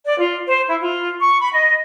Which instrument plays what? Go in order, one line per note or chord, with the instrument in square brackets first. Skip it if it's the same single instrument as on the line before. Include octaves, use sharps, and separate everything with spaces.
[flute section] D5
F4
C5
E4
F4
C#6
B5
D#5